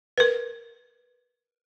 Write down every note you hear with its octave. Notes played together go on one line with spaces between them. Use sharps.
A#4 B4